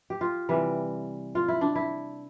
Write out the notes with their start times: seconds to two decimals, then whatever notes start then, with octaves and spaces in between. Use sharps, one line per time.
0.10 G4
0.21 F4
0.49 C3 E3 G3
1.35 F4
1.48 E4
1.61 D4
1.75 E4